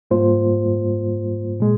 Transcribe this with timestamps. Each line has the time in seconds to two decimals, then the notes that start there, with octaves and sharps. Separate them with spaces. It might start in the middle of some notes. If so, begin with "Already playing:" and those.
0.11 G#2 G3 A#3 F4 C5
1.60 A#2 G#3